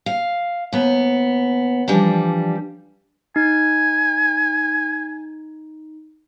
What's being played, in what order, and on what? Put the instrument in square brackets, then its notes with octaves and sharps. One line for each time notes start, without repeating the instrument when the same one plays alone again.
[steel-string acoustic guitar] F5
D#2 B3
E3 F3 G3 D4
[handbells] D#4 [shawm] G#5